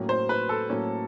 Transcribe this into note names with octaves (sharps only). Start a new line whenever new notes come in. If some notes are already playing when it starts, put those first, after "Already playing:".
Already playing: A2 F#3 A#3 C#4
C5
B4
A4
A2 F#3 A#3 C#4